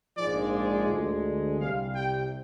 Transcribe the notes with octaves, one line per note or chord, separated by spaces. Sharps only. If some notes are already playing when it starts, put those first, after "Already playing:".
A#1 G#2 F3 G#3 D5
D5
D2 D3 G#3
C2 C3 G3 F5
G5